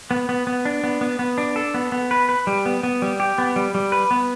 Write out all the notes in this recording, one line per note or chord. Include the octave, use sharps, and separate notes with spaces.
B3
B3
B3
D4
B3
B3
B3
D4
A4
B3
B3
B4
B4
G3
B3
B3
G3
G4
B3
G3
G3
B4
B3